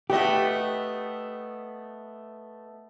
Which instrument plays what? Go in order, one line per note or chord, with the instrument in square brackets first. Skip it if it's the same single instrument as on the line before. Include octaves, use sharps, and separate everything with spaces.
[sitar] A3 B3 D#5 [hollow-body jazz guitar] G4